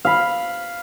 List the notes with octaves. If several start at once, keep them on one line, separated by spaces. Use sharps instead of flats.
F5 B5